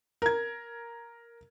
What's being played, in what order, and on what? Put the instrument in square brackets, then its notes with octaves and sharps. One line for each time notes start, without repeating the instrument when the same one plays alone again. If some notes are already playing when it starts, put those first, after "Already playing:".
[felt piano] A#4 G#6